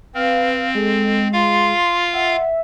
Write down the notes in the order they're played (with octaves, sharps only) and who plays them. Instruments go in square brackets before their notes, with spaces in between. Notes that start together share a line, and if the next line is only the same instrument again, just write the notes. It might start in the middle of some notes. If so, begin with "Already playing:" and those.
[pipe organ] C4 [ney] B4 [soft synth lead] F5
[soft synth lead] G#3 [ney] A4
[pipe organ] F4 F5 [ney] C6
[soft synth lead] E5 [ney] F#5